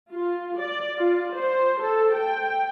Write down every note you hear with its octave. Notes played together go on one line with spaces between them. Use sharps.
F4
D5
F4
C5
A4
G5